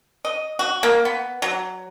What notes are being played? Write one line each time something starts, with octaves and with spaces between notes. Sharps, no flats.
D#5
F#4
A#3
B3
F#3